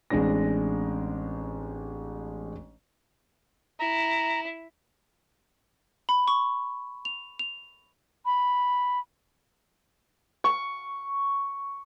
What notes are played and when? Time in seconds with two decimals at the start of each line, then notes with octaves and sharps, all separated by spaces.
0.10 A1 G#3 C4 D4 A#6
3.80 E4 A#5
6.09 B5
6.28 C#6
7.05 F7
7.39 F7
8.25 B5
10.44 C#6